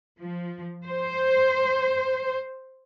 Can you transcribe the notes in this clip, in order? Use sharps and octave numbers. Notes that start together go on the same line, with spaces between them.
F3
C5